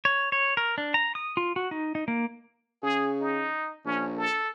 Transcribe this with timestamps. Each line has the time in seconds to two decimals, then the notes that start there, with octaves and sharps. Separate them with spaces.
0.05 C#5
0.32 C#5
0.57 A#4
0.78 D4
0.94 A#5
1.15 D#6
1.37 F4
1.56 F#4
1.71 D#4
1.95 D#4
2.08 A#3
2.83 C#3 G#4
3.21 D#4
3.85 A#1 C#4
4.17 A4